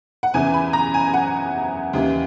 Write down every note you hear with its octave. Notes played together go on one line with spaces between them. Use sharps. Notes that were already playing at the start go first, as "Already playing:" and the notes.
F#5
E2 C#3 E3 G#5
B5
A#5
G#5
F#5
D#2 C#3 E3